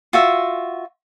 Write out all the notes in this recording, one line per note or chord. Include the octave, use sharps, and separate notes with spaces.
F4 F#4 E5